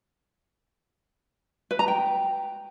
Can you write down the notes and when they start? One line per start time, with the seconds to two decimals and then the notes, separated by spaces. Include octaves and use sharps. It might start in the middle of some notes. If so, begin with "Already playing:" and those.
1.71 B4
1.79 A#5
1.88 G5